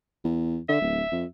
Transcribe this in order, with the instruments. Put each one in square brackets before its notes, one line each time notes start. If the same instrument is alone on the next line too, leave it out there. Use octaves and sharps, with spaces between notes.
[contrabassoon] E2
[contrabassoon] D3 [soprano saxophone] E5
[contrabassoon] D1
F2